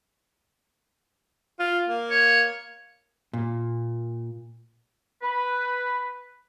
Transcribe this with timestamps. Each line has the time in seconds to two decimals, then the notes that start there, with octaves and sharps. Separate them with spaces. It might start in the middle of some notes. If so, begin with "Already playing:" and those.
1.59 F4
1.88 A#3
2.11 C#5
3.33 A#2
5.22 B4